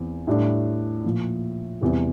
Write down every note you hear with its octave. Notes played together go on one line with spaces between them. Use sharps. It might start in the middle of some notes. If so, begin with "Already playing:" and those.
Already playing: E2 E3 C4
A2 G3 D4
A#2 F3 A#3
E2 C3 G3